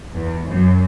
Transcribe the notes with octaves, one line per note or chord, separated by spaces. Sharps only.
E2
F#2